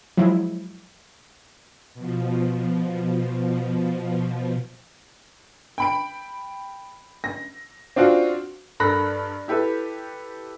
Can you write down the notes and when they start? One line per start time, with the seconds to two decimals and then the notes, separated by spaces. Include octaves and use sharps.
0.17 F3 F#3 G#3 E4
1.94 B2 F3
5.78 G5 B5 D7
7.24 A#6
7.96 C4 D4 F4 F#4
8.80 G2 A4 A#4 B5 F#6 A#6
9.48 E4 G4 A4 B4 E5